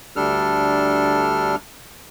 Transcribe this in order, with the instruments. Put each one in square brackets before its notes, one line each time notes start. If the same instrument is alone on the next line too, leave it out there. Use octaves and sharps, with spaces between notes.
[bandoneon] D2 G3 D4 A4 F6